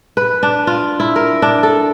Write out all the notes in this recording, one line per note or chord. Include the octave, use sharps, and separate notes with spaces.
B4
D4
F4
E4
A#4
D4
A4